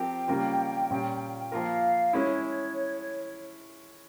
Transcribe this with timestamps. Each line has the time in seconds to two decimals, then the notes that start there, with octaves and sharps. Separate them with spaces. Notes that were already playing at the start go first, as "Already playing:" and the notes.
Already playing: F3 C4 G4 A#4 G5
0.28 C#3 G3 A#3 F4
0.90 A#2 G3 C#4 F4
1.52 F3 A#3 F4 A#4 F5
2.13 G#3 C#4 E4 C#5